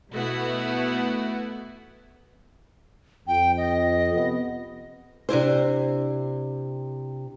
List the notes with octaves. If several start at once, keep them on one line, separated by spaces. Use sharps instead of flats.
B2 A3 B3 E4 F#4
F2 G5
D#5
C3 B3
C3 D4 E4 C5